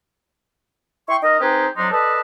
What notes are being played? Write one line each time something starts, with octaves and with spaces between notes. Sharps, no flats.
E4 G5 C6 C#6
D#4 A#4 D#5
C4 D#4 G4 G#4 B4
F2 F#3 D4 D#4 C6
A4 B4 D5 D#5 A5